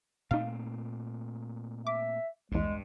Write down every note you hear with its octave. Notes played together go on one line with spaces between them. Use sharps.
A#2 A3 C4 D#4 F5
E5 D6
B1 E2 G2 G#3